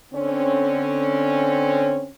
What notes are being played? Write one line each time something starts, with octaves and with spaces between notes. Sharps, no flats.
D3 C4 C#4